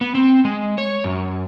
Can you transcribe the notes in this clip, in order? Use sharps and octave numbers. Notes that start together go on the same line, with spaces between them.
B3
C4
G#3
C#5
F#2